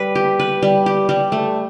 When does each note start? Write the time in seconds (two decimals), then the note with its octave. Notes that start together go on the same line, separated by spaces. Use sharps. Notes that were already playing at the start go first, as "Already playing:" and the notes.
Already playing: G3 B4
0.15 G4
0.40 B4
0.63 G3
0.86 G4
1.09 G3
1.32 A3